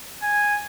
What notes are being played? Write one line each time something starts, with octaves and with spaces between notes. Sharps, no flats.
G#5